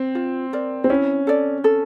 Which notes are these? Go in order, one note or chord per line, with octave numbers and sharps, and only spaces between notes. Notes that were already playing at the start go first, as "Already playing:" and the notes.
Already playing: C4
F4
A#4 D5
C4
C#4 E4
A4 D5
A4